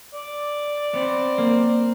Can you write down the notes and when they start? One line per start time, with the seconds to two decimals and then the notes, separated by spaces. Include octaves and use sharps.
0.14 D5
0.93 B3 C4
1.38 A#3